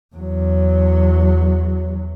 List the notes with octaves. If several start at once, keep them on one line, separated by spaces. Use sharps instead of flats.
E2 F#3